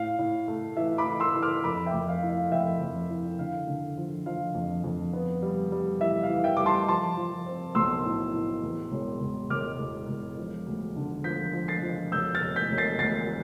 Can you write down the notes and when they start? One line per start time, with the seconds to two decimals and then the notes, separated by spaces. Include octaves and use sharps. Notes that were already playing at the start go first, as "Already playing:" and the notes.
Already playing: A2 F5
0.19 A2
0.48 A3
0.77 E3 E5
0.98 B5 D6
1.06 E3
1.20 C6 E6
1.36 E3
1.42 D6 F6
1.64 F2 B5 D6
1.86 E5 G5
1.94 F2
2.08 F5
2.23 E4
2.29 F5
2.52 F2 E5 G5
2.81 F2
3.10 E4
3.39 D3 F5
3.67 D3
3.97 F3
4.26 F3 F5
4.55 F2
4.84 F2
5.13 B3
5.42 G3
5.72 G3
6.01 E3 E5
6.23 F5
6.29 E3
6.44 E5 G5
6.57 G3 D6
6.66 A5 C6
6.88 F3 A5 C6
7.17 F3
7.46 C4
7.75 B1 C6 E6
8.05 A2
8.33 A2
8.63 E2
8.91 E1
9.21 E1
9.50 E1 D6 F6
9.79 E1
10.08 E1
10.37 F3
10.66 D2
10.96 D3
11.24 F3 G6 B6
11.53 F3
11.68 A6 C7
11.83 F3
12.12 E1 E6 G6
12.35 F6 A6
12.41 E1
12.56 G6 B6
12.71 E1
12.78 A6 C7
12.99 D2 A6 C7